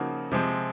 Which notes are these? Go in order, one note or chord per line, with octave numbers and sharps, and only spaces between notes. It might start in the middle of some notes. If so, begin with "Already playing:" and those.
Already playing: C#3 F3 A#3 D#4 F#4
C3 F3 G#3 C4